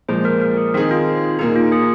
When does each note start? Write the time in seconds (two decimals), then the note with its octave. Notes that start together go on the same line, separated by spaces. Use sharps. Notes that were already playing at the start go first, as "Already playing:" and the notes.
0.08 A#2 F3 G#3 C5
0.25 A#4
0.41 A#4
0.57 G#4
0.74 D#3 C4 D#4 G#4 A#4
0.91 F4
1.39 A#2 A#3 D#4 G#4
1.56 F4
1.72 G#4